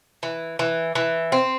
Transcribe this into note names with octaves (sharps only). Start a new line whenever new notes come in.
E3
E3
E3
C4